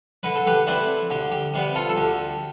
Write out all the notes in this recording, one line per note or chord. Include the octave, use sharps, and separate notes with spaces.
D3 B4
A4
G4 B4
A3 C4 E4 B4 D5
D2 G4
G4
C3 G3 B3
F4 A4
A4
D2 G4